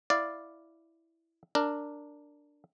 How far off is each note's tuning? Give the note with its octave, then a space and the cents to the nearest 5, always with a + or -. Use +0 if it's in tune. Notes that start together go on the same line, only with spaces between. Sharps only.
E4 +0 D5 +0 F5 +0
D4 +0 A#4 -15